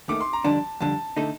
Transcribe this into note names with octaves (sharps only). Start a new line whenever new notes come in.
D#2 D#3 A3 D6
C6
A#5
F2 D3 G3 D4 A5
F2 D3 G3 A5
D3 A3 D#4 A4